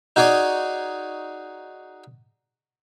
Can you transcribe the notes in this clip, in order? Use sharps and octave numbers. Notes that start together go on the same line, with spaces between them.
D#4 F#4 G#4 C#5 D5